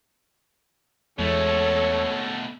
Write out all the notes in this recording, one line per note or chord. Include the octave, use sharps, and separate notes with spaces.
E2 B2 E3 G#3 A3 A4 C#5